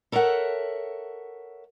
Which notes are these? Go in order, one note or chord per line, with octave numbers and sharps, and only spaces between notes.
A4 A#4 C#5 E5 F#5